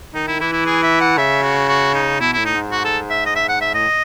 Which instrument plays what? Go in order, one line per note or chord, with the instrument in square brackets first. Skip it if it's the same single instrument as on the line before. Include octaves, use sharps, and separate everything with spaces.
[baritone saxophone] D#3 [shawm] D#4
[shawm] E4
[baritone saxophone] E3 [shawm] E4
[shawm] E4
G#4
E5
F#5
[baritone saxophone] C#3 [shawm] E5
[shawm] F#4
F#4
D#4
[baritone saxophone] B2 [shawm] E4
[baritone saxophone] A2 [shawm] E4
[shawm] D#4
[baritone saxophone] G#2
[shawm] F#4
A4
E5
D#5
E5
F#5
E5
[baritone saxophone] A2 [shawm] D#5